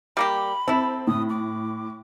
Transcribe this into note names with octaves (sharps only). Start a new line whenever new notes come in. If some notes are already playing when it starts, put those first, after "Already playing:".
G3 A#3 G4 B5
C4 E4 A4
A2 D#6
D6